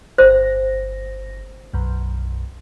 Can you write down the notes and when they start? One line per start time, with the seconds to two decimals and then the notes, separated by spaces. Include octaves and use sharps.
0.18 G1 C5 A#6
1.74 B1 F#2